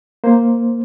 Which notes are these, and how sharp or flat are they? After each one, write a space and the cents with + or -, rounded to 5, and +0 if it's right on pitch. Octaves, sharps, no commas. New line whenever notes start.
A#3 +0 C5 +0